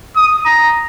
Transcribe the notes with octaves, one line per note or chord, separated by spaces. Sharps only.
D#6
A#5